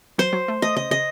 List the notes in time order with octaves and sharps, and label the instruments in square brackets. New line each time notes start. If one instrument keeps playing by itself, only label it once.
[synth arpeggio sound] F#3 [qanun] C5
[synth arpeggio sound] F#3
A3
[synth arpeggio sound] A3 [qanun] D#5
[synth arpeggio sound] C#3 [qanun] D#5
[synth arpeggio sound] C#3 [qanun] D#5